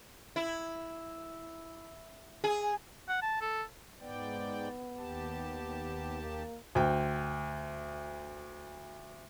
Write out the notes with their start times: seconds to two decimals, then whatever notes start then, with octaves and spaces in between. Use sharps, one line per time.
0.36 E4
2.44 G#4
3.09 F#5
3.22 A5
3.41 A4
4.00 G#2 B3 D5 G5
4.97 D#2 G4 A5
6.22 A#3
6.75 D2 G5